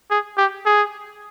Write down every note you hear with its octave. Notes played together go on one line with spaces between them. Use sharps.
G#4
G4
G#4